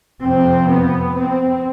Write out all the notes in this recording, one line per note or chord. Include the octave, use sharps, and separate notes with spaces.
F2 C3 C4
B3
C4